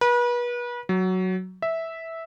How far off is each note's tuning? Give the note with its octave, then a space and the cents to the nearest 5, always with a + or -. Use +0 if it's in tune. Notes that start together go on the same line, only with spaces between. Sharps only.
B4 -35
F#3 +5
E5 -10